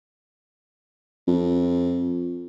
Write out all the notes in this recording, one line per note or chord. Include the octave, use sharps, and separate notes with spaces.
F2